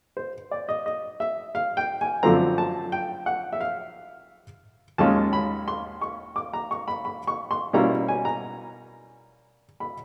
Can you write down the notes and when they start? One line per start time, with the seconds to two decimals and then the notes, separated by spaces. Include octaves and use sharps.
0.17 C5
0.51 D5
0.69 D#5
0.86 D#5
1.20 E5
1.55 F5
1.77 G5
2.01 G#5
2.23 F#2 D3 F3 A3 C4 A#5
2.58 A5
2.92 G5
3.26 F#5
3.53 E5
3.61 F5
4.98 D#2 D#3 G#3 C#4 F4 A5
5.33 B5
5.68 C6
6.02 C#6
6.36 D6
6.53 A#5
6.71 C#6
6.88 B5
7.05 B5
7.27 C#6
7.51 C6
7.73 B2 G3 A#3 C#4 E4 A#5
8.08 G#5
8.25 A#5
9.80 B5